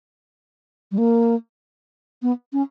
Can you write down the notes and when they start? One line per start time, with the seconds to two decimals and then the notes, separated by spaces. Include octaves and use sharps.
0.92 G3
0.98 A#3
2.22 B3
2.53 C#4